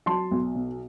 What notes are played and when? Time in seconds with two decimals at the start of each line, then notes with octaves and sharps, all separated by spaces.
0.06 F#3 A5 C6
0.31 B1
0.55 B2